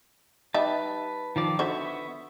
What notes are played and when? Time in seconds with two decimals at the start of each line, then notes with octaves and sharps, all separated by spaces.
0.54 G3 D#4 B4 E5 A5
1.36 D#3 F3 D5
1.59 D3 B3 F#4 C5 E5 C#6